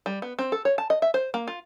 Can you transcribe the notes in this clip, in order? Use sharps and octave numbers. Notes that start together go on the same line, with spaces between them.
G3
B3
C4
A4
C#5
A5
D#5
E5
C5
A#3
F4